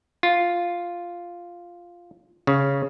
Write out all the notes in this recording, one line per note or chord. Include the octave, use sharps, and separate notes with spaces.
F4
C#3